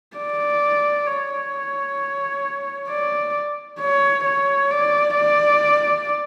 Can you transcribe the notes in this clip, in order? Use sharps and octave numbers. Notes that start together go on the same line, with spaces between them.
D5
C#5
D5
C#5
C#5
D5
D5